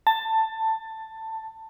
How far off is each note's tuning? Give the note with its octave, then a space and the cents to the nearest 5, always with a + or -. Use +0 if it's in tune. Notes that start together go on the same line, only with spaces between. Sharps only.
A5 +15